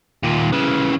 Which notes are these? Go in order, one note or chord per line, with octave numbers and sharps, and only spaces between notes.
D#2 A#2
C#3 E3